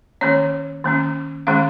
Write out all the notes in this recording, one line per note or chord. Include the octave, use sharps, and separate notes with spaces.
D#3 A#3 C#4 C#5
D#3 A#3 C#4
D#3 G#3 C#4 F5